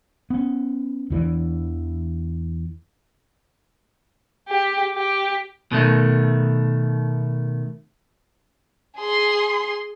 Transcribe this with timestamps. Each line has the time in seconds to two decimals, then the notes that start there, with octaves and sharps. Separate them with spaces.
0.30 B3 C#4
1.10 E2 E3 G3 D4
4.49 G4
4.96 G4
5.72 B2 D#3 A3
8.98 G#4 C6